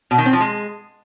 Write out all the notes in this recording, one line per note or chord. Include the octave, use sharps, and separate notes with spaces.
B2
D#3
C4
F3
G#3